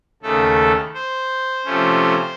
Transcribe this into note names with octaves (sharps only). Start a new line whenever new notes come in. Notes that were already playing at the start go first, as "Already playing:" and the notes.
D#2 C#3 A3 A4
C5
C3 F3 A3 C#4